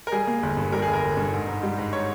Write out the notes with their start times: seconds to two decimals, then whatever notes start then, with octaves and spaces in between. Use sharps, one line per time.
0.07 A#4
0.12 G3 G#4
0.27 A#3
0.43 G1
0.57 G2
0.72 G3 A#4
0.82 G#4
0.87 G1
0.93 A#4
1.03 G1
1.17 G2
1.32 G#2
1.47 G#2
1.63 G3
1.78 G#2
1.93 C#5